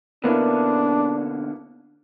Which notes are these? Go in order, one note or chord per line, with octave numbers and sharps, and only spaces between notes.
B2 D3 A#3 B3 C#4 D4 E4